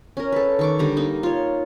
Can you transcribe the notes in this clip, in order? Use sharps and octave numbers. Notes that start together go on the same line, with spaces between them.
C#4 A#4
A4 B4
D#3 C#6 D6
D3 G3 A#5
A#3 D#4
F4 C#5